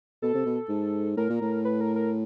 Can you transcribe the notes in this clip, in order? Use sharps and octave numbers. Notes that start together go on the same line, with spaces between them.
B2 A4
C3
B2
G#2
A2 A#4
A#2
A2
B4
A#4
A#4